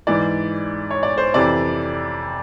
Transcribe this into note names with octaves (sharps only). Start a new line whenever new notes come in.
G#2 E3 D5
C#5
D5
C5
F2 C3 E3 D5